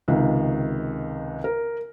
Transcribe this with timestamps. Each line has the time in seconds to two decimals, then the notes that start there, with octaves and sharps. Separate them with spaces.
0.08 C#2 C3 D#3
1.44 A#4